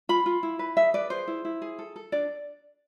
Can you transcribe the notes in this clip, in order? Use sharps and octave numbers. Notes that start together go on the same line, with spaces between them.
F4 B5
F4
E4
B4
G#4 E5
B4 D5
G#4 C5
E4
E4
G#4
A4
A4
D4 D5